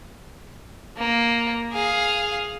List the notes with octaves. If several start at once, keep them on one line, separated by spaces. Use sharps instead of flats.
A#3
G#4 F5